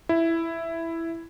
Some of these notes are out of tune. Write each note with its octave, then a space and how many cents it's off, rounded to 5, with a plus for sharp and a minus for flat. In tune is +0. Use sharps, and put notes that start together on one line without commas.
E4 +5